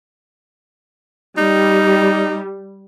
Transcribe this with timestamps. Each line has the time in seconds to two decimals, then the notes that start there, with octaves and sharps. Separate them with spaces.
1.37 G3 D#4